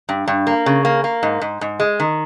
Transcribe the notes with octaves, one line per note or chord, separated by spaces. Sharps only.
G2
G2
A#3
C#3
A#3
A#3
G#2
G#2
G#2
G#3
D#3